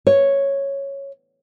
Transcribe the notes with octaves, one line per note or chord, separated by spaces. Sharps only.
C#5